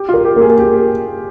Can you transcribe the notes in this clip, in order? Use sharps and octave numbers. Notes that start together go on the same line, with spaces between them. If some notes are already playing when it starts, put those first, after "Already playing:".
Already playing: G4
F4
A#4
G4
A#3
G#4
A#3 G4